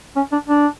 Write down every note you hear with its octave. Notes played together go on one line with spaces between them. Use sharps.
C#4
D4
D4